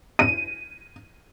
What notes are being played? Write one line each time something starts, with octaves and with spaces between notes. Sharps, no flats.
D#7